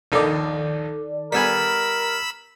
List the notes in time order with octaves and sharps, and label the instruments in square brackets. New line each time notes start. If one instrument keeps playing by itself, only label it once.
[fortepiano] A#1 D#2 D#4 [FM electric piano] D#3 A4 D5
[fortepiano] G3 B3 G#5 [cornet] A#4 [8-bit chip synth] B5 E6 B6